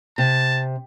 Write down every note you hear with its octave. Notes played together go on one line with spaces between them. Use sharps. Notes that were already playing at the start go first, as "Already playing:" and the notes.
C3 A5